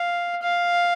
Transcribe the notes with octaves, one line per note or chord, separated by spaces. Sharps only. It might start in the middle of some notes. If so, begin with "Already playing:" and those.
Already playing: F5
F5